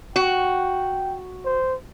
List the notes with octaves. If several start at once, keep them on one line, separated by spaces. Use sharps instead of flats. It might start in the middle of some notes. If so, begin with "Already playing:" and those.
F#4 G5
C5